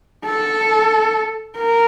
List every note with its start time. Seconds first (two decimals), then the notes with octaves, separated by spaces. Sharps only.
0.25 A4
1.57 A#4